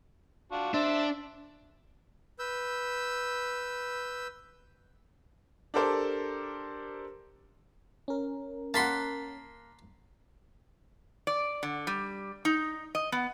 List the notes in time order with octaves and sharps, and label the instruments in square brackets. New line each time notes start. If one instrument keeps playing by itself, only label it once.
[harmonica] D4 F4 F#4
[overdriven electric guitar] D4 [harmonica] C5 E5
[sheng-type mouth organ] B4 E6 G6
[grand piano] D4 G4 A4 A#4 C5 D5
[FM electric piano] C#4 A#4
[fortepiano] A#3 F#5 [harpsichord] A5 B5 C6
[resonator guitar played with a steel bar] D5
D3
G3
D#4
D#5
B3